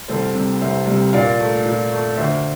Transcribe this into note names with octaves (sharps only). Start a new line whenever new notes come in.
C2 A4 C5
C3 G3
C2 C5 E5
C3 G3
A#2 D5 F5
A3
A#2
A3
D2 C5 E5